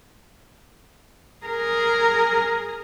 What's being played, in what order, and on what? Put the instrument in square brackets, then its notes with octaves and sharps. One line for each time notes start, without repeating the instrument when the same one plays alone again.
[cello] G#4 A#4